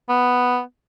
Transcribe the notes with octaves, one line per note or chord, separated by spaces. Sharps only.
B3